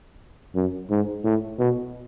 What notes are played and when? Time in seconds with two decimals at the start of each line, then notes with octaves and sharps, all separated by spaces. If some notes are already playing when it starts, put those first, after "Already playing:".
0.55 F#2
0.90 G#2
1.24 A2
1.59 B2